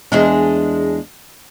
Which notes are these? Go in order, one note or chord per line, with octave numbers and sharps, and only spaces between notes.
E2 G#3 D4